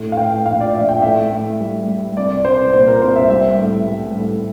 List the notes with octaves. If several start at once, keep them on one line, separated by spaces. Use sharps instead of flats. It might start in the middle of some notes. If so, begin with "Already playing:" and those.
Already playing: A2
F5
A2 G5
A#1 F5
D5
A#1 E5
G5
A2 E5
A2
G3
G3
C2 D5
C2 C5
A#2 C5
A#4
C2 C5
E5
G3 E5
A2
G3
A2